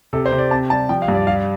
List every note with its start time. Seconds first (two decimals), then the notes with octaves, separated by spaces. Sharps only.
0.13 C3 A4
0.26 C5
0.32 C3
0.38 D5
0.51 C4 A5
0.70 G3 A5
0.89 F3 G5
1.02 F5
1.08 G2
1.15 D5
1.27 G3 F5